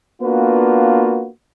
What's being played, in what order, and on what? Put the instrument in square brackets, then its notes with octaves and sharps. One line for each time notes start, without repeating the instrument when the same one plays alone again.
[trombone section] A#3 B3 D4 F4 F#4 B4